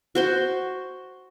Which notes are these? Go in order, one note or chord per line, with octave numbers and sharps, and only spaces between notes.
F#4 C5 C6